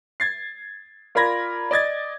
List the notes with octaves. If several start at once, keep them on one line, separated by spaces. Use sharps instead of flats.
G#6 A6 C7
F4 A#4 D5 B5 G#6 A#6
D5 D#5 G#6 A6